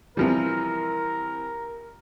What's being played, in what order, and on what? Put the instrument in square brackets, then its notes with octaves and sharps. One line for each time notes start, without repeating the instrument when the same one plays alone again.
[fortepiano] C3 F3 G3 [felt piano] E3 C4 [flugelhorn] A#4